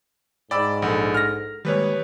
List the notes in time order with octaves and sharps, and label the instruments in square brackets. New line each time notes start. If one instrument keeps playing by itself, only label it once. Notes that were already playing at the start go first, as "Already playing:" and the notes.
[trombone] G#2 [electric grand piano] D5 B5 E6 [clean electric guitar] G5
[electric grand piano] A#1 [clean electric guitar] A4 A#4 F#5
[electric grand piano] F6 A#6
[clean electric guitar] D#3 G#3 A#3 [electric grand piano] G3 B4 C#5